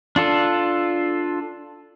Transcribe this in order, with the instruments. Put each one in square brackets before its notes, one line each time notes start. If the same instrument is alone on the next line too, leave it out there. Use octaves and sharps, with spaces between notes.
[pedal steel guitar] D4 F4 A4